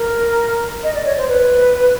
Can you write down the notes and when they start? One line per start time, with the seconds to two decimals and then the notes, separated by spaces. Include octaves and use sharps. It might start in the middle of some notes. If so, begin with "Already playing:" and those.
Already playing: A#4
0.83 D#5
0.94 D5
1.05 C#5
1.18 C5
1.28 B4